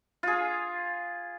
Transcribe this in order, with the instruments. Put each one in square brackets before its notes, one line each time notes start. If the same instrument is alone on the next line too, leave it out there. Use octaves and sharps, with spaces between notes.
[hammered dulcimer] F4 G#4